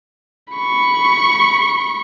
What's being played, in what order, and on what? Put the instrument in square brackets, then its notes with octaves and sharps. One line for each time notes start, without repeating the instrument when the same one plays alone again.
[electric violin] B5 C#6